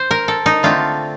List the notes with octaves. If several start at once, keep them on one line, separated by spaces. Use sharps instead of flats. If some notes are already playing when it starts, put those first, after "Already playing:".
Already playing: C5
A#4
A4
D#4
D3 A3 C4 F4